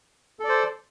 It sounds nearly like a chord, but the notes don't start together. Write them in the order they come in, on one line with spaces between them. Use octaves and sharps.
A4 D5 C5